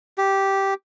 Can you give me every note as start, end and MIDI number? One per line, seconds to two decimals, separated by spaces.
0.18 0.74 67